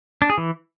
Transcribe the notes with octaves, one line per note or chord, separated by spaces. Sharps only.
D4
G#4
E3